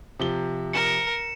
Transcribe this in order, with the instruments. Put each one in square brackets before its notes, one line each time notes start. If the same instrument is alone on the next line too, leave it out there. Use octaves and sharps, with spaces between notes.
[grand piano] C3 F3 G7
[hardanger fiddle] A#4 [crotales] C#7 E7